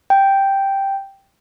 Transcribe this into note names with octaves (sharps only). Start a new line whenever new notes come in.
G5